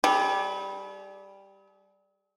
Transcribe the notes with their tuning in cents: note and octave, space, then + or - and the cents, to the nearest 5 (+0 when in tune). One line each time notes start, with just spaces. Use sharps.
G3 +0 G#4 +45